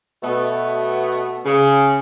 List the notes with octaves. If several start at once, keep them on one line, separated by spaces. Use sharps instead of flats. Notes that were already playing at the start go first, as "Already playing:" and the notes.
B2 A3 B3
C#3